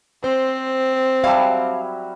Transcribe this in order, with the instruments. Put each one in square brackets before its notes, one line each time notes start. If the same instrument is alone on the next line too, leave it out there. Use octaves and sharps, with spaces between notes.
[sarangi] C4 [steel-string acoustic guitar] C5
[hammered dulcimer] F#3 G3 E4 [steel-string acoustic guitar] F5 A5